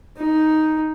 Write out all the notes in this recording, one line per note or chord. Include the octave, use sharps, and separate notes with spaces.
D#4